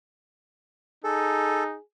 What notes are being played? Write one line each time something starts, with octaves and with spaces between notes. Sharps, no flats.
D#4 G#4 A4